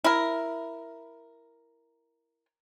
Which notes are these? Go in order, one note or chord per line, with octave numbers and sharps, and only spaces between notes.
E4 A#4